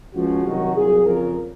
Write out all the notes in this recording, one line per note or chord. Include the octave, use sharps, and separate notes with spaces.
C#2 C#3 F3 F#4
C2 C3 D#3 F#3
C2 A#2 F#3 G#4
F2 C#3 F3 A#4